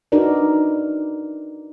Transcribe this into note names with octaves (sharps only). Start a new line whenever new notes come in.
D4 D#4 F#4 A#4 B4 D5